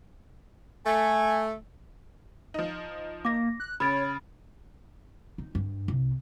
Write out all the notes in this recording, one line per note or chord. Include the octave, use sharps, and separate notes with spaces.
A3 G#5
F3 D#4
A#3 D6 A#6
F#6
C#3 C#5 B5 A6 D7
D#4
G2
C2